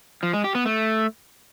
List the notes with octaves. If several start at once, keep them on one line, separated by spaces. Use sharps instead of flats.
F3
G#3
G4
B3
A3